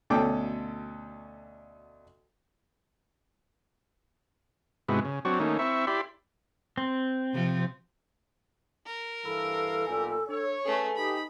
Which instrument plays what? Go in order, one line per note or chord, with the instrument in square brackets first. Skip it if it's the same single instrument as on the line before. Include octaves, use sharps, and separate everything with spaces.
[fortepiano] D2 B2 C#4 A4 G5 D6
[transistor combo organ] G#2 C3 G#3 B3 E4 F#4
C#3
F#3 C4 D4 F#4 C#5
D#3 A3 A#3 C#4 D#4
C4 E4 E5 C#6
E4 G4 D5 B5 C6
[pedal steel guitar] C4
[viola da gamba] C3 F3
[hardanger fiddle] A#4
[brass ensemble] G2 E3 F5 [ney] A4 [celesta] B5 E6
[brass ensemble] B1 A#2 G3 [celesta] G#5
[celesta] D4 [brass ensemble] C#5
[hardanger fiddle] A3 G#4 [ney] C#4 [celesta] A4 B4 G#5
[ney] D#4 [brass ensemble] G4 [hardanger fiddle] B5